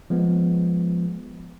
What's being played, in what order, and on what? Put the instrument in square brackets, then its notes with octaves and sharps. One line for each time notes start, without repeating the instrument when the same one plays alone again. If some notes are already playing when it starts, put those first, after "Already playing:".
[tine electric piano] F3 G#3 B3